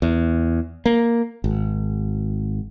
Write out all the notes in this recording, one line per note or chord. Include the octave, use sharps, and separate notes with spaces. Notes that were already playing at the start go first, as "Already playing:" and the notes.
E2
A#3
G#1